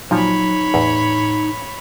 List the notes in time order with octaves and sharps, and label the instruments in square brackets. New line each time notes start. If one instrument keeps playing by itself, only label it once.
[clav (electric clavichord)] A#2 F3 [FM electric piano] F#3 [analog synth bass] D#4 [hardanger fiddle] C#5 B5
[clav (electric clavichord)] E2 [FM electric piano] A2